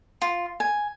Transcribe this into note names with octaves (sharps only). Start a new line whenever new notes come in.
F4
G#5